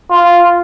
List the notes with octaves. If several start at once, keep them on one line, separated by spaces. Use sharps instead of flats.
F4